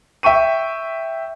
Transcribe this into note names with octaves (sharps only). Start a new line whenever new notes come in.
E5 G5 C#6 D#7